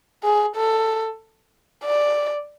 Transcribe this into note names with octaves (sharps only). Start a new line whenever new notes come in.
G#4
A4
D5